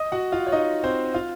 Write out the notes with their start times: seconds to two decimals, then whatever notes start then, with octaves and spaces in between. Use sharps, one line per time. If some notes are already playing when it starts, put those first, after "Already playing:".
Already playing: D#5 D#6
0.12 F#4 F#5
0.32 F4 F5
0.47 C#5
0.52 D#4 D#5
0.84 C4 C5
1.14 F4 F5